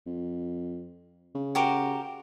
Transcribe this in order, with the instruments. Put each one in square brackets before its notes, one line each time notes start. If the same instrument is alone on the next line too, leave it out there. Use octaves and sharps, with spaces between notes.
[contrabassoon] F2
C#3
[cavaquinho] F#4 G4 A#4